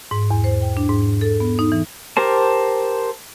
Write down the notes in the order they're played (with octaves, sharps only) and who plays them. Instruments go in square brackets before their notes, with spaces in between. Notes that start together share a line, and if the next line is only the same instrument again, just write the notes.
[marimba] G#2
E2
C5
G5
D4
G#2
A4
B3
D#4
E3
[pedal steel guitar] G4 A#4 C5 A5